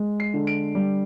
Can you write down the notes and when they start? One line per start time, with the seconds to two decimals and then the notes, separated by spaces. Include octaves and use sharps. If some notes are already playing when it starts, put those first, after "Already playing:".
Already playing: G#3
0.20 C7
0.34 D3
0.47 D7
0.75 G3